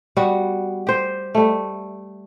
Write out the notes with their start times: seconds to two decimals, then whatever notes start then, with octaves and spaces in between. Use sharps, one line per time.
0.17 G3 B3 F#4
0.87 G4 C5
1.35 G3 A3